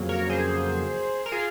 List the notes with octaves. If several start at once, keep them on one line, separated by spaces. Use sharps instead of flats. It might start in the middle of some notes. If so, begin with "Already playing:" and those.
Already playing: F2 C#3 F#3 A#3
A#4 C#5
G#4 C5
A#4
F4 G#4